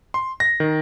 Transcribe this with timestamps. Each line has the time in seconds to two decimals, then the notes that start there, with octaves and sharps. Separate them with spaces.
0.14 C6
0.40 A#6
0.60 D#3